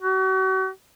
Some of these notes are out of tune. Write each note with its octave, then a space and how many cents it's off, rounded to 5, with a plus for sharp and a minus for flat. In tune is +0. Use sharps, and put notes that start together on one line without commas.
F#4 +40